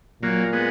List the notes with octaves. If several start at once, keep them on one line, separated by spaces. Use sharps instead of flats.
A#2 F#3 A#3
G#3 B3